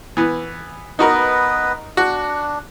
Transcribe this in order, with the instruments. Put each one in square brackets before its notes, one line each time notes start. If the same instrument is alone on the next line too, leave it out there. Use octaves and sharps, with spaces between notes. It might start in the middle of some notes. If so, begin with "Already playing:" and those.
[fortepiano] E3 B3
[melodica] B3 B4 D#5 [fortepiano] D#4 F#4 A#4
[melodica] D4 [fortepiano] F#4